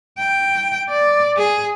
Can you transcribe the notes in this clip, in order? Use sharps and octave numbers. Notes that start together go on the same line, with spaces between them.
G5
D5
G#4